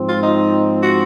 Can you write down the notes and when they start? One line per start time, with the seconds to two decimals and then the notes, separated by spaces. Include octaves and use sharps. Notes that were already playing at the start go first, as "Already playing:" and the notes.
Already playing: G#2 F3 C4
0.09 F4
0.23 D#4
0.83 F#4